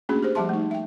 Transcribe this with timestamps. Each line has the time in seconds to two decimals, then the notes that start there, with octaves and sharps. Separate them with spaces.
0.09 A3 A#3 C#4 D4 F#4 G#4
0.23 G4 G#4 C5
0.35 F3 G3 G4 E5 A5 C6
0.49 A3 D#4
0.71 E5 G5